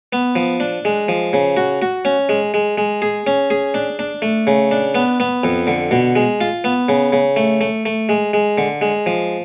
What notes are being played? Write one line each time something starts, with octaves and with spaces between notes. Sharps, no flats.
B3
F3
D4
G#3
F3
C#3
F#4
F#4
C#4
G#3
G#3
G#3
G#4
C#4
G#4
D4
D4
A3
C#3
D4
B3
B3
F2
D3
B2
G#3
F4
B3
C#3
C#3
A3
A3
A3
G#3
G#3
D3
G#3
F3